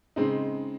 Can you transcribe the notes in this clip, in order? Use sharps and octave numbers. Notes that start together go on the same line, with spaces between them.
C#3 G#3 C4 D#4